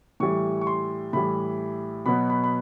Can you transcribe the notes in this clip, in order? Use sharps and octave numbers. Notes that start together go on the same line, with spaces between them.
A2 E3 G3 C#6
C#6
C6
A2 E3 G3 B5
B2 F#3 B3 B5
B5
B5